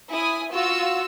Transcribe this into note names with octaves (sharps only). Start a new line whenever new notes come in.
E4 G#5 D#6
F4 F#4 E6